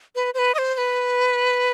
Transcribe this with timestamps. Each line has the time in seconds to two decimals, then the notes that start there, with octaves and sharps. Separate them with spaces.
0.15 B4
0.34 C5
0.39 B4
0.54 D#5
0.58 C5
0.74 C5
0.78 B4